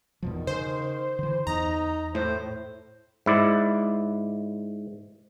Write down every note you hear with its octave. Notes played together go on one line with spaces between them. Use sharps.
E2 B2 D#3 F3
C#3 C5
D3 E3
E2 D#4 A#5
A2 C5
G#2 E4 D5